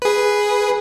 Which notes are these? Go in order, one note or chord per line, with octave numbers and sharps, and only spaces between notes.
G#4 B4